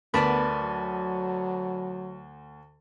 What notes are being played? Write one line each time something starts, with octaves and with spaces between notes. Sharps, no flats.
D2 B3 A#4 B4 D5 A5 B5
F#3